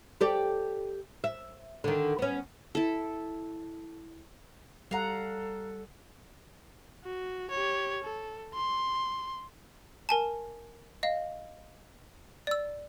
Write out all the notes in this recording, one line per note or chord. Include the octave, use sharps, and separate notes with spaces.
G4 A4 D5
E5
D3 D#3
B3 C#4
E4 A4
G3 A4 F5 F#5 A#5
F#4
G4 C#5
A4
C6
A#4 G#5 A5
D#5 F5
D5 E6